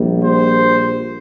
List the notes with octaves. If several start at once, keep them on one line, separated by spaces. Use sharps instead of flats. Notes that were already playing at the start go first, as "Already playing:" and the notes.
Already playing: A#1 A#2 G3 A#3
C5